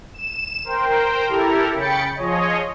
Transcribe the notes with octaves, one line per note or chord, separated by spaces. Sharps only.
E7
A#4 C5 G5
E4 G4 A4 A#4
C#3 G5 B5 A6 C#7
F3 G#4 C#5 D#5